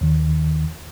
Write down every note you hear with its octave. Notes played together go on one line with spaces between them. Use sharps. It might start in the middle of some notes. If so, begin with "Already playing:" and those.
D#2 D#3